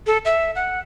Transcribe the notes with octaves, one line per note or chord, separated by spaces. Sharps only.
A4
E5
F#5